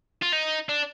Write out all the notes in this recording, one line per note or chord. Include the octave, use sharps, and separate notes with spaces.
F4
D#4
D4